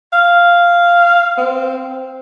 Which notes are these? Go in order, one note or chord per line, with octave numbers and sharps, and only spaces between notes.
F5
C4